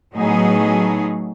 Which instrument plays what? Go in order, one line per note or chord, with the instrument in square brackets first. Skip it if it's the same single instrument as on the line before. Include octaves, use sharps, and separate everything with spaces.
[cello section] A2 F#3 A3 B3 D#4 G#4